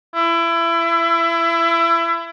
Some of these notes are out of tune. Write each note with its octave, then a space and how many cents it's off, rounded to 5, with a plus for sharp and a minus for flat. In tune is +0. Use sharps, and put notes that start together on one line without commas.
E4 +25